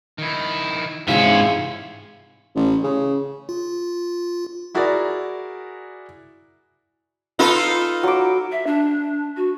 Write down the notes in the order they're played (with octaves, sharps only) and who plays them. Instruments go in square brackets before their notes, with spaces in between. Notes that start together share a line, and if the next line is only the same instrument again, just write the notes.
[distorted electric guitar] D#3 E4
[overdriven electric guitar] G#2 E5 [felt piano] C3 E3 G#3 [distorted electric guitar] C#4 [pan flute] F5
[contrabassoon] A1
C#3
[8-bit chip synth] F4
[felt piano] E4 F#4 G#4 A#4 D5
[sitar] D#4 F4 A4 [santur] B4 B5 C6
[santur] F#3 D6
[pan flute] E5
D4
F#4